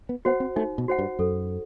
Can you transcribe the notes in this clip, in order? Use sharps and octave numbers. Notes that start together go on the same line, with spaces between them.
B3
B3 F#4 C5 F#5
C4
A3 D#4
B2
F#4 C5 F#5
G2
F#2 A4